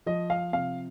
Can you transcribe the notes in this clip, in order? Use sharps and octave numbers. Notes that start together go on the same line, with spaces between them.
F3 D#5
F5
C3 F5